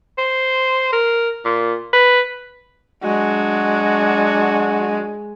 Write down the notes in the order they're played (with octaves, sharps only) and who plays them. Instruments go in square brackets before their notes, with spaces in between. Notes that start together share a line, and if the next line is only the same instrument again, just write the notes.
[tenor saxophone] C5
A#4
A#2
B4
[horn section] F#3 D4 F#4 [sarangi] G#3